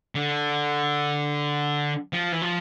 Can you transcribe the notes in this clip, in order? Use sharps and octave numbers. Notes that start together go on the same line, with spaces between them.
D3
F3
E3
F3